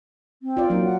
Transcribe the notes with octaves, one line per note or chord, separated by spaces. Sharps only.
C4
F4 D5
F#3 A#3 D#4
F#5